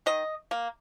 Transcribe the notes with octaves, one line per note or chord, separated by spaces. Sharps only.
D#3 D#5
A#3